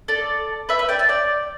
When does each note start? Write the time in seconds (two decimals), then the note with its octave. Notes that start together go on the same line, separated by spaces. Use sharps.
0.08 A4 D5
0.69 B4 E5
0.79 B4 E5
0.89 D5 G5
0.99 E5 A5
1.09 D5 G5